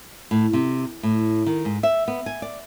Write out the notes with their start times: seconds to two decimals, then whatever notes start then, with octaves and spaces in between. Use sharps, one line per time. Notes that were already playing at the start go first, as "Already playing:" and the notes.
0.31 A2
0.53 C3
1.03 A2
1.46 D#3
1.65 G#2
1.83 E5
2.08 B3
2.26 G#5
2.42 D5